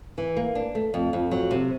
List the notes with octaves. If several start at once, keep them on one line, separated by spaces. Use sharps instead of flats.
E3
A#3
D4
A3
F2
F2
F#3
C3